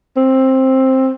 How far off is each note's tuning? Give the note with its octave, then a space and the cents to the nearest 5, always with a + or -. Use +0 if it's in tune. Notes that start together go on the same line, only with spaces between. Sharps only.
C4 +10